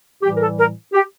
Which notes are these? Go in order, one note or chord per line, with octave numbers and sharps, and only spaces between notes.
A2 E3 G3 G4
A#4
A4
A#4
G4